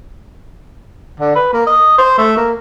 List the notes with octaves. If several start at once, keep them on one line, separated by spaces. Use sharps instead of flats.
D3
B4
A#3
D#5
C5
A3
A#3